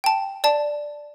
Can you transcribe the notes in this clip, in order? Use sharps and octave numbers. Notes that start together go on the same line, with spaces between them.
G5 A5
D5 A5